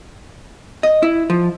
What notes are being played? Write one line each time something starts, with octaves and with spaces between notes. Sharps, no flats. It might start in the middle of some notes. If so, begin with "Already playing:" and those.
D#5
E4
F3